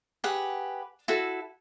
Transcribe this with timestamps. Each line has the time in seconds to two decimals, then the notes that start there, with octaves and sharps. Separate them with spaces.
0.24 G4 G#4 B4 F#5
1.08 E4 F#4 A4